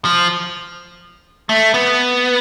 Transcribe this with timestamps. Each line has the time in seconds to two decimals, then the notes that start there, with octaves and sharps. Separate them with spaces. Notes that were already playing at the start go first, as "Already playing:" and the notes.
0.05 F3
1.49 A3
1.74 B3